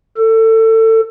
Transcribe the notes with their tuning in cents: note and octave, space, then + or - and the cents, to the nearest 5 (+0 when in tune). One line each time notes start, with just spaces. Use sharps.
A4 +25